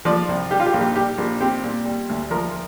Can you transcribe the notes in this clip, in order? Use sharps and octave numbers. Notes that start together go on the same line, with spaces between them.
F3 D5
C2
G3 G4
F4
G4
A#1
G4
G3 G4
A#1
C4 G4
A#2
G3
D2
F3 A#4